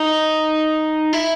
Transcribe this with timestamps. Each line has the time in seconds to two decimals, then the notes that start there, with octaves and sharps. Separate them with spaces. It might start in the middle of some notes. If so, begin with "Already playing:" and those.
Already playing: D#4
1.13 E4